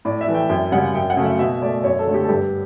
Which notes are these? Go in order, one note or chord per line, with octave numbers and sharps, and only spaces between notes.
A2 D5
E5
E3 A3
G5
F#2 G5
C#3 G3 F#5
F#2 G5
F#5
C#3 F#3 A3
E5
B2 E5
A3 D5
F#2 C#5
A4
D3 A3
G4
A4
G2 G4